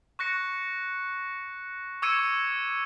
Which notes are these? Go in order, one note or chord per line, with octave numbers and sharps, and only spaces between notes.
C#6 F#6 A#6 C#7
C#6 D6 E6 G#6 C#7 D#7